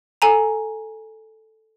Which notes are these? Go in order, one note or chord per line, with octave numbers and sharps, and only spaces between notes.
A4 G#5 A#5